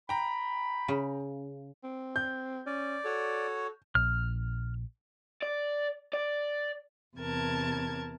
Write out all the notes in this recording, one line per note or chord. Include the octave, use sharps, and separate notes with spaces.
G5 A#5 B5
C#3
C4
G6
C#4 D5
F#4 A4 C#5
A#1 F6
D5
D5
E2 C3 A#4 A5 G#6